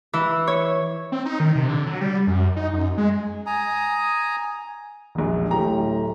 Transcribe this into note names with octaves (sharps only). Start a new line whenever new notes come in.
E3
C#5
C4
D#4
D#3
C3
D3
F#3
G3
F#2
D#4
F#2
G#3
G#5 A#5 D#6
E1 A#1
D1 A2 G4 A#5